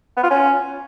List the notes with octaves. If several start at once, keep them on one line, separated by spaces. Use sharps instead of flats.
B3
F4
C#4